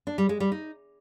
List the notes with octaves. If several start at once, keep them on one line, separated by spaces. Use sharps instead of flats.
D4
G3
G#3
G3
D#4